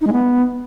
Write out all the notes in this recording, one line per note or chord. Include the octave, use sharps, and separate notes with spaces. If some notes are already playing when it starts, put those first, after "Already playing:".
D#4
G#3
B3